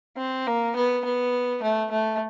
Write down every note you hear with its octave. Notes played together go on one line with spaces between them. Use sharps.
C4
A#3
B3
B3
A3
A3